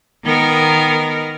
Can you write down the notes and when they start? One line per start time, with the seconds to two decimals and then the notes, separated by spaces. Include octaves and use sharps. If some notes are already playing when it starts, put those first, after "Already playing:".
0.25 D#3 B3 A#4